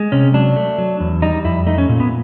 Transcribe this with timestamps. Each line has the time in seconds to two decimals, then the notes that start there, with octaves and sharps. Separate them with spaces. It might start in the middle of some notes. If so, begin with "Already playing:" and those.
Already playing: G#3
0.12 C3 C#4
0.34 F#3 D4
0.56 A3
0.78 F#3
1.00 E2
1.22 G3 D#4
1.44 F2 E4
1.66 A3 D#4
1.78 C#4
1.89 A#2
2.00 B3